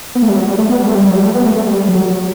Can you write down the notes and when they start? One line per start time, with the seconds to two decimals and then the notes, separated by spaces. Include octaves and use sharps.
0.15 B3
0.22 A3
0.29 G3
0.36 F#3
0.47 G3
0.58 A3
0.69 B3
0.80 G3
0.87 A3
0.95 G3
1.09 F#3
1.16 G3
1.24 A3
1.34 B3
1.45 A3
1.56 A3
1.67 G3
1.89 F#3
2.10 F#3